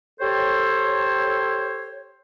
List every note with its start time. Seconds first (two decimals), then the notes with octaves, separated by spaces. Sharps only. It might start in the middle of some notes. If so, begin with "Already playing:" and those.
0.20 G4 A4 C5 C#5